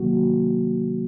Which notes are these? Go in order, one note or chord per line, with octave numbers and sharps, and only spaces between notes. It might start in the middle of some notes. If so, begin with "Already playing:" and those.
Already playing: C3 D#3 F#3 A#3 F#4